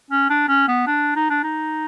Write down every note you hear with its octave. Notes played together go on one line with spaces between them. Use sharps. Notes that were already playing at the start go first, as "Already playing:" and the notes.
C#4
D4
C#4
B3
D4
D#4
D4
D#4